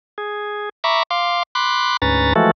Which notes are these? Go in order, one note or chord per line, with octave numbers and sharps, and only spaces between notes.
G#4
E5 A#5 B5 C#6 D6
F5 C6 D6
B5 C6 D6 F#6
D2 G#2 C#4 B4 A#5 A6
E3 F3 G#3 A3 F#4 A4